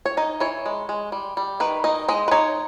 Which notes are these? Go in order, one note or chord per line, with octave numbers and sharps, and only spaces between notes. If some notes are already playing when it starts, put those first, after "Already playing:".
C#5
D#4 D#5
E3 C#5
G#3
G#3
G3
G3
D#3 B4
D#4 D#5
G#3 D#5
B4
D#4 C#5